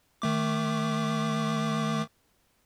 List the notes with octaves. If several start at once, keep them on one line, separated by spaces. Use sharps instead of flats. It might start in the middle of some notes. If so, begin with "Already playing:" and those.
D#3 A3 D6